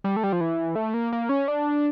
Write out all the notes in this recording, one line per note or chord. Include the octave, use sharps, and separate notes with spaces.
G3
A3
G3
F3
E3
A3
A#3
A#3
C#4
D4